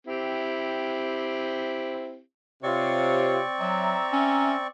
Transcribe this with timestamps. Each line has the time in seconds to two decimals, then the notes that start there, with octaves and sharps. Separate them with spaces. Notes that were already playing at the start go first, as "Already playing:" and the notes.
0.07 C4 E4 G4
2.63 C3 C4 F4 C#5 D5 C#6
3.60 F#3 E5 A#5
4.13 C#4